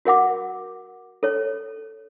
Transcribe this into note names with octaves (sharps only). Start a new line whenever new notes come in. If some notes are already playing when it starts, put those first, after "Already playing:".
F#4 A#4 F#5 D6
A4 C#5